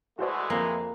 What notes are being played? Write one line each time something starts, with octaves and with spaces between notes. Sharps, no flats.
E3 G#3 A3 F#4 C5 D5
F2 F3 A#3